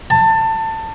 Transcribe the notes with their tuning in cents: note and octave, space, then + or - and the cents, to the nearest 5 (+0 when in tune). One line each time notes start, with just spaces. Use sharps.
A5 +20